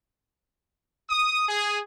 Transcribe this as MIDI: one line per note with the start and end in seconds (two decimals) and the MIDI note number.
1.10 1.47 87
1.49 1.79 68